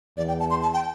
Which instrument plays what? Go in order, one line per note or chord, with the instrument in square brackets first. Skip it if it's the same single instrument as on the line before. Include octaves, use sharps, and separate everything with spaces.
[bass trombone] E2 [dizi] D5
[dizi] G5
A5
C6
A5
G5